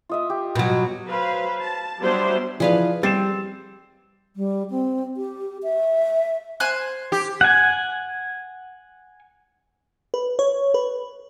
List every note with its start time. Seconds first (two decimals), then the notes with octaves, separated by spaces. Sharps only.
0.09 F4 D#5 E5
0.30 G4
0.55 B2 F#3
1.08 F#3 B4 C5 F5
1.61 A5
2.00 F#3 G3 B3 D4 C5 E5
2.60 E3 F3 G#4 B4 D5 F5
3.03 G3 C4 G4 A6 C7 E7
4.36 G3
4.70 C4
5.17 G4
5.63 E5
6.60 C5 G#5 F#6
7.12 G4
7.41 F#5 G#5
10.14 B4
10.39 C#5
10.74 B4